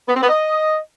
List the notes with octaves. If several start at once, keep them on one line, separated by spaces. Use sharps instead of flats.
B3
C4
B3
D#5